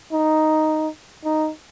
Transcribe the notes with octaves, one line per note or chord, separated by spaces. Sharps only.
D#4
D#4